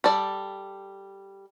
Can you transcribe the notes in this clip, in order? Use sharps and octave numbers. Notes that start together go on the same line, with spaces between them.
G3 A4 D5